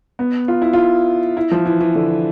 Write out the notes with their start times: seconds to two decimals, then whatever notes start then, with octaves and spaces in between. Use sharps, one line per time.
0.19 B3
0.48 F4
0.62 E4
0.73 F4
1.37 E4
1.51 F3
1.66 E3
1.81 E3
1.95 D3